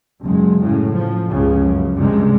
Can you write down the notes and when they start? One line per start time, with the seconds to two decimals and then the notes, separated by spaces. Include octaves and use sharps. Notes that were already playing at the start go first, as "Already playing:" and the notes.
0.22 F#1 G#3
0.61 A2 C#3
0.91 F3
1.28 C#2 G2 C#3
1.62 F#2
1.96 G2 C3 G3 G#3